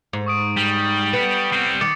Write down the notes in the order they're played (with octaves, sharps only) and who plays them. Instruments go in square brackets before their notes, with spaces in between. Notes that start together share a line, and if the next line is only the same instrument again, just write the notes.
[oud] G#2
[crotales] C#6 D#6 D7
[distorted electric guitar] G3 [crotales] F#7
[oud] B3 [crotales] B6 C#7
[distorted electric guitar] G3 C4 [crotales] C7
[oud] D#3 [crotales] D6 A6 C#7